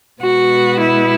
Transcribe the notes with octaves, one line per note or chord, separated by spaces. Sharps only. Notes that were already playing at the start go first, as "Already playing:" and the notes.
B2 G#3 B3 F#4
E4